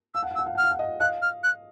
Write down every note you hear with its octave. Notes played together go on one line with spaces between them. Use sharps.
F5 E6
F#5
F5
E6
F#5
F5
F#5 F6
F5
F#5
D#5 F5
D#5 F5 F#6
F6
F#6